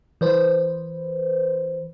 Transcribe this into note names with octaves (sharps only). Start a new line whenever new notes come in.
E3 B4 C5